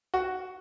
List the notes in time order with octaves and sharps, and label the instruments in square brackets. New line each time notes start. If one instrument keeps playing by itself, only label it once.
[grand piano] F#4